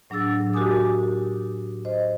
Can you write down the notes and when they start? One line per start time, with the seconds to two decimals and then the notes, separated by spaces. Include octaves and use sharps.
0.10 A2 F#3 D4 G#4 E6 A6
0.54 F#4 G4 A#4 G#5 D6 D#6
1.85 C5 D#5